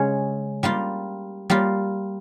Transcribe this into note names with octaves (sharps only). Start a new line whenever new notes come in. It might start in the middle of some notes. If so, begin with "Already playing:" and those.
Already playing: C#3 G#3 C#4 G#4 C#5
G3 A#3 F4
G3 A#3 F4